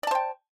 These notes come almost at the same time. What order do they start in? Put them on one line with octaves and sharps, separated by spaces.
D5 A5 C5 G5